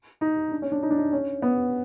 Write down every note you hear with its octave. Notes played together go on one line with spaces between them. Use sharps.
D#4
D4
C#4
D4
D#4
D4
D#4
C#4
B3